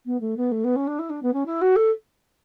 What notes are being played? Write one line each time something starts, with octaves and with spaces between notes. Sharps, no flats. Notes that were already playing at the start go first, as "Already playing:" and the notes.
B3
A3
B3
A3
B3
C#4
D4
E4
D4
B3
C#4
E4
F#4
A4